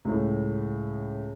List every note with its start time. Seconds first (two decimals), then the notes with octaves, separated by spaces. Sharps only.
0.05 C#2 A2